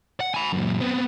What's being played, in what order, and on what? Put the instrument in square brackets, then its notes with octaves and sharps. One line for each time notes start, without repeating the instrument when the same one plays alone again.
[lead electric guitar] F#5
G#5 B5
F#2 A#2
B3 C4